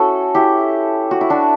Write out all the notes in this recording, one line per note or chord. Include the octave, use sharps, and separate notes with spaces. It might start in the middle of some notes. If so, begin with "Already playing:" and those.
Already playing: C#4 E4 F#4 A4
E4 G4
F#4
E4
D4 F#4